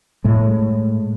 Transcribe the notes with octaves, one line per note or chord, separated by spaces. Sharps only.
A2 G#3